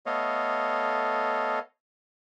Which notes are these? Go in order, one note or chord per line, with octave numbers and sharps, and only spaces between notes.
A3 B3 A4 C#5 D#5 F5